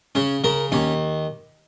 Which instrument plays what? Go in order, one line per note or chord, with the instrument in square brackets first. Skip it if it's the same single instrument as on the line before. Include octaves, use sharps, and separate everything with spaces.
[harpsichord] C#3 C#4
C#3 A#4
D#2 C#4